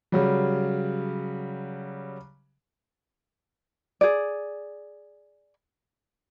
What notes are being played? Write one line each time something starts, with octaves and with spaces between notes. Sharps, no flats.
C#3 F#3 G3
G#4 D5